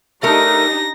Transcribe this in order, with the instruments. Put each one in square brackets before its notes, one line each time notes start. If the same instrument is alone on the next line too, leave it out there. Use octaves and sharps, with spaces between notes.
[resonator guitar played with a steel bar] A3 A#4 [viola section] D4 D#4 G4 [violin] A#6